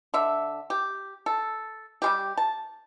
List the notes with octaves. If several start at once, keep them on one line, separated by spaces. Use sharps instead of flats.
D3 E5
G4
A4
G3 G#3 G4
A5